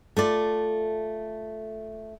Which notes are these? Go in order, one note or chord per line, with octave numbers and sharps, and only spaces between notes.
A3 F4 D5